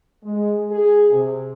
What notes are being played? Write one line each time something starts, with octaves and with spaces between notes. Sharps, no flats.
G#3
G#4
C3